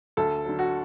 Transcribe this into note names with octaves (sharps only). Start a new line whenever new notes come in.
D2 A4
D3 F#3
F#4